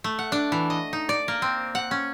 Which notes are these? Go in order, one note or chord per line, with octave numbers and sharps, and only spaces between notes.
A3
F#5
D4
E3
D#5
D#4
D5
A#3
C4
F#5
C#4